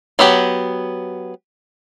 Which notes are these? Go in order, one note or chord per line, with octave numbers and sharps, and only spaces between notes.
F#3 B3 G4